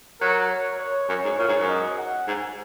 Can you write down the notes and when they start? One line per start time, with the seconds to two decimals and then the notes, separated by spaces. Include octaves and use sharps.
0.21 F#3 A#4
0.50 C#5
0.80 C#5
1.09 F#2 C#5
1.24 G#2
1.39 A#2 C#5
1.48 G#2
1.59 F#2
1.68 D#5
1.98 F#5
2.28 G#2 G#5